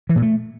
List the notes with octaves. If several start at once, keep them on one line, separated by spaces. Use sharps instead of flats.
E3
A#2
A3